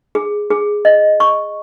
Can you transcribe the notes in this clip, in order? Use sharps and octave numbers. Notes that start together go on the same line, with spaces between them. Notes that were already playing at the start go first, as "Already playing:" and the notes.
G#4
G#4
D#5
C#6